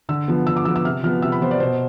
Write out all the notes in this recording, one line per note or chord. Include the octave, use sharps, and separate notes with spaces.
D3 E6
F3 B3
D3 E6
D6
F3 B3 E6
E6
C3 F6
F3 B3 F6
C3 E6
B5
F3 B3 C5
D5
B2 C5